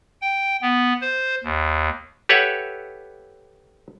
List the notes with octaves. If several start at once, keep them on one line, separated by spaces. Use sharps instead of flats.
G5
B3
C5
D#2
G4 A4 B4 C#5 E5 F#5